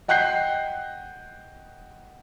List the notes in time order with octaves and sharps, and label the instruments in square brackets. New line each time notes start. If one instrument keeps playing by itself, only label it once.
[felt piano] D#5 F#5 G5 F#6 G6 C7